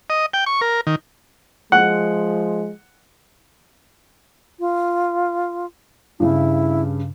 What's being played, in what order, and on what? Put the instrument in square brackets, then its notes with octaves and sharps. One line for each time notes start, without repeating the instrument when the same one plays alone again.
[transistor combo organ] D#5
G5
C#6
A#4
D#3
[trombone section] F3 G#3 [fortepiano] F#5
[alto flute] F4
[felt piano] G2 C#3 [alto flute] E4